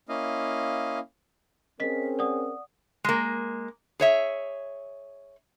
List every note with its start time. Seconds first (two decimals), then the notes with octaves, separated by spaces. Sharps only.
0.09 A#3 C#4 E4 D#5 F5
1.80 C4 C#4 G#4 A#4 D#5 B6
2.19 D5 F#5 D#6
3.04 G#3 A#3
4.00 G#4 C#5 E5